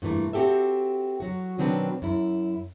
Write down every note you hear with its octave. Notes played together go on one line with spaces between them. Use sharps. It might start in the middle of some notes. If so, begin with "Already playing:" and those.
G2 A#2 E3 A3
C4 F#4 G4 A4 E5
F#3 F#4
B2 D#3 F#3 C4 D4 B4
F#2 E4